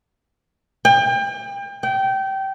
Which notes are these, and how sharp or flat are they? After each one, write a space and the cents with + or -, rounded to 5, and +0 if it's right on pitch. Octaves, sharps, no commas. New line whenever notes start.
G5 +35
G5 -20